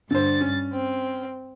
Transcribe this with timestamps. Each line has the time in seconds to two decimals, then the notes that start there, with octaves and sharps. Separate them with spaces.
0.11 G2 D3 C5 A6
0.41 C#4
0.72 C4